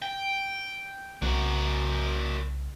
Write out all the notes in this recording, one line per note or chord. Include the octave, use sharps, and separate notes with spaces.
G5
C2 C#3 A#3 F#4